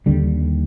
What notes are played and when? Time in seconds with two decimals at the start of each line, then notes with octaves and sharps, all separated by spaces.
0.06 D#2 D3 G3